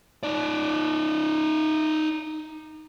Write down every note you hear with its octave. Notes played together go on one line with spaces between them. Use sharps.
D#4 D5